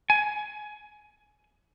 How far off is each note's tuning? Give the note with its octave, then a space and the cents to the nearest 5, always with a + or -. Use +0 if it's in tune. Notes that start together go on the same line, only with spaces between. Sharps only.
G#5 +20